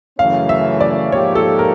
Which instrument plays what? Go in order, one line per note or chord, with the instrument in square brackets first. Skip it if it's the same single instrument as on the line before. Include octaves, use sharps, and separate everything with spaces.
[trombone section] F#2 C#3 E3 A3 C#4 [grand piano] F5
[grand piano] E5
D5
[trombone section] G#2 F3 A#3 D#4 G4 [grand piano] C#5
[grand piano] A4
A#4